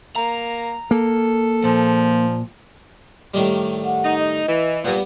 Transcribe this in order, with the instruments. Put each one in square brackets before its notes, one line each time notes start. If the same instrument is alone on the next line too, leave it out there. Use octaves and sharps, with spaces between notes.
[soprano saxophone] A#3 [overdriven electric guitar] A#5
[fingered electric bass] A#3 [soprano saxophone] A4
[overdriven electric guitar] A#2 [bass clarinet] F3
[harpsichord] A2 D#3 G3
[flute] F#5
[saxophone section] D#4
[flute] D#5
[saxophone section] E3
[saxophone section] A#2 [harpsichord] G3 B3